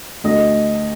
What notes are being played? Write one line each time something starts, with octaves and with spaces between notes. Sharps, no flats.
D2 D#5